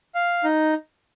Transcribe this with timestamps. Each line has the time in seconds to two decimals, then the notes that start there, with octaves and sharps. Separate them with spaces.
0.15 F5
0.44 D#4